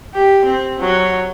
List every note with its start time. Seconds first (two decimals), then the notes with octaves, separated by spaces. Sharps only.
0.14 G4
0.45 C4
0.80 F#3